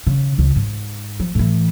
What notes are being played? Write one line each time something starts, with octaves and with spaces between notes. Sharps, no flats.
C#3
C#2 C#3
G#2
F3
A2 E3